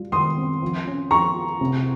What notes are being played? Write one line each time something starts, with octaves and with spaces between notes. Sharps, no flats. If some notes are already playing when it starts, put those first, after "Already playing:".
Already playing: G3 F4
D#3 C6 D#6
C4
F3
C#4
F3 A#5 C#6
F4
C3